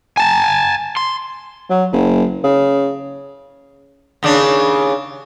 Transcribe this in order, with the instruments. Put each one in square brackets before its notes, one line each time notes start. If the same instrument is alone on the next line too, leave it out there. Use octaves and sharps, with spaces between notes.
[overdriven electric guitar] G#5 A5
C6
[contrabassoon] F#3
F#1
C#3
[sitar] D#2 C#3 D4